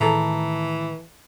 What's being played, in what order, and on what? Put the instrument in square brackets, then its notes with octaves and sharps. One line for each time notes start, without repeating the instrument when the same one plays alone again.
[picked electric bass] A2 D#3 [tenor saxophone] E3 [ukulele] G#4 A4 A#5